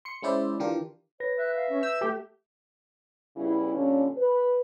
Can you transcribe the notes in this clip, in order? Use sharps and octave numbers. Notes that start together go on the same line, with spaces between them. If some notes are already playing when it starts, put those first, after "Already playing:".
C6 C#7
G#3 C#4 E4 C5 D5 E5
D3 E3 D4 F4 G4 A#4
B4 C#5 A#6
E5 F#6
F5
C#4
E6 G6
A3 G4 A4
C#3 G3 B3 E4
A#2 D3 G3 C#4
B4